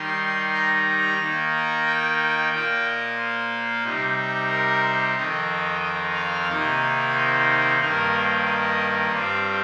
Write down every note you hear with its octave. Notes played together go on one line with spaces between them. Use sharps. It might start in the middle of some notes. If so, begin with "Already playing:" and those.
Already playing: D#3 G3 D#4 C6
A#5
D#3 A#3 D#4
G5
A#2 A#3 F4 G5
D#5
C5
C3 G3 D#4
A#4
C5
F2 D#3 C4 D#5
D#5
F5
C3 D#3 A#3 D#4 D#5
C5
G2 D#3 A#3 A#4
C5
D#5
G2 G3 C4 F4 C5